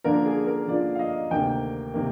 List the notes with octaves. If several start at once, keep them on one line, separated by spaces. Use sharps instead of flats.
D3 F3 A#3 D4 F4 A#4
G#4
A#4
D3 F3 A#3 D4 F4 D5
F5
D#5
D2 C3 D#3 A#3 G5
C3 D#3 A#3